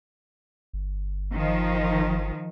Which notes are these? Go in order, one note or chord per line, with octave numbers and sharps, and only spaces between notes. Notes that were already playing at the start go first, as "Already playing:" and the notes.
G1
D#3 F3